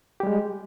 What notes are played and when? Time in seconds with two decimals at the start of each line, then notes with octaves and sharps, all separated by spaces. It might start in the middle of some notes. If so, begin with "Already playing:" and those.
0.20 G4
0.23 G3
0.27 G#3